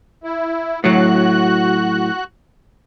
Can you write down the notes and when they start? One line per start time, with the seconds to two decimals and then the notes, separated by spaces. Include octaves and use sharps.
0.24 E4
0.84 A2 F#3 F#4 F#6